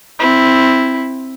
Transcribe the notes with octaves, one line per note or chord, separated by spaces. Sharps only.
C4 E4